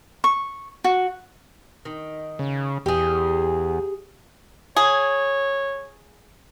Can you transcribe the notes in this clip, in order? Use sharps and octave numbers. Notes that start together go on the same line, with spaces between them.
C#6
F#4
D#3
C#3
E2 G4 G#4
G#4 C#5